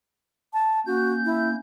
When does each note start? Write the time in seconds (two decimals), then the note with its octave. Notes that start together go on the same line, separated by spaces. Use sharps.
0.53 A5
0.86 A#3 C#4 F#4 G6
1.25 E4